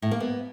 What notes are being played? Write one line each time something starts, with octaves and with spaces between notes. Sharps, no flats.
A2
A#3
B3